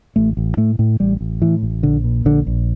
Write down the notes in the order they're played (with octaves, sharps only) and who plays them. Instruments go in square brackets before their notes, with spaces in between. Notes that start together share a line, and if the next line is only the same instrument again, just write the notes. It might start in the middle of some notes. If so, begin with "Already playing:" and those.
[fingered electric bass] A1 A3
A1
A2 A3
A2
A1 G3
A1
A2 E3
A1
A#1 D3
A#2
A#1 D3
A#1